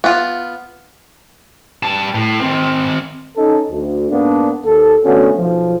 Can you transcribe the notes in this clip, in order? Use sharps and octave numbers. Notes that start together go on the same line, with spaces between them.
B3 F4
G3 A5
A2
D#3 C4
C#4 D#4 A4
D2
G#2 A#3 B3 D4
D#2 A4
D3 A3 B3 C#4 F#4
B1 F3